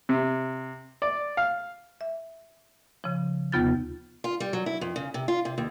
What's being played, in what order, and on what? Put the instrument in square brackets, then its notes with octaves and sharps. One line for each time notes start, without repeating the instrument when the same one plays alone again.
[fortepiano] C3
D5
F5
[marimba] E5
C#3 F3
D#2 C3 B3 F4 G6 A6
[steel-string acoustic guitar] F4
G3
F#3
E4
F2
C#3
C3
F4
C3
D#2